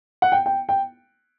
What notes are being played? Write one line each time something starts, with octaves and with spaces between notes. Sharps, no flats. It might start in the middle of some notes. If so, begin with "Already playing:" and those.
F#5
G5
G5
G5